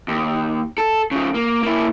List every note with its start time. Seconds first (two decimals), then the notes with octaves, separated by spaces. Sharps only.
0.08 D#2
0.78 A4
1.11 C#3 F3
1.34 A#3
1.63 A#3 E4